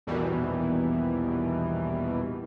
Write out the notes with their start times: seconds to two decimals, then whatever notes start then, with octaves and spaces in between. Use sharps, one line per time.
0.07 A#1 E2 B2 D#3 E3 G3